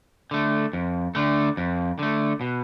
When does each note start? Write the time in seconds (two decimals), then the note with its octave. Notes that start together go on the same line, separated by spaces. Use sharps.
0.31 D3 A3
0.73 F2
1.15 D3 A3
1.57 F2
1.99 D3 A3
2.41 B2